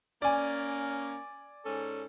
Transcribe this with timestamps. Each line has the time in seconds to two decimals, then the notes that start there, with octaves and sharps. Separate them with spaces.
0.22 A#3 C#4 D5 G#5
1.64 G#2 C#4 A4